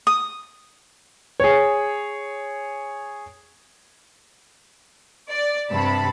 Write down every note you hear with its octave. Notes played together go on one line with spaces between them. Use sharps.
D#6
G#4 C#5
D5
G2 C3 A5 B5